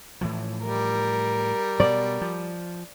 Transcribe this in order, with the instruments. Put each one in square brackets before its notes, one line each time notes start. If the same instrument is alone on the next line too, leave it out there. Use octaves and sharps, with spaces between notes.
[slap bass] A2 E3 F3
[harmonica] G3 [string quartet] A#4
[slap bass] B2 [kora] D5
[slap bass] F3